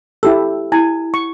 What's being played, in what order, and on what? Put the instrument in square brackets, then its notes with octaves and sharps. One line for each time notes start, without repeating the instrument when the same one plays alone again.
[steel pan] E4 G4 A4 [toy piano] E6
[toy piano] E4 [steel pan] G#5
[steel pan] C#6